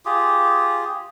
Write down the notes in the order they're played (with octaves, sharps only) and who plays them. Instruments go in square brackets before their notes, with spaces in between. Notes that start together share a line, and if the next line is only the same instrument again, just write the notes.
[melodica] F4 G4 G#4